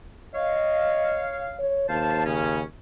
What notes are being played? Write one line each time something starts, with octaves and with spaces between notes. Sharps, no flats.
C#5 D#5 F5
C#5
D#2 C5 F5 A5
C#3 C#4